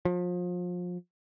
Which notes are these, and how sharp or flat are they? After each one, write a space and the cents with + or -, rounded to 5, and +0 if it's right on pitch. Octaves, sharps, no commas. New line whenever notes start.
F3 +30